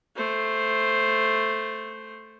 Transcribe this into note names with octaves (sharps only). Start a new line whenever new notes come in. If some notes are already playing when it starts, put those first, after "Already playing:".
A3 C5